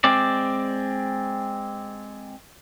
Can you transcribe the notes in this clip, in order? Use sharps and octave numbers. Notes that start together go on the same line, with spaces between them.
G#3 C4 D5